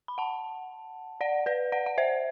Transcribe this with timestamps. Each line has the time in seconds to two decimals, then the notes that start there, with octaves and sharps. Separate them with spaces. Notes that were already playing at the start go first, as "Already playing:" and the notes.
0.08 B5
0.18 F#5 A5
1.21 D5 F#5
1.46 B4 D5
1.72 D5 F#5
1.86 F#5
1.98 C5 E5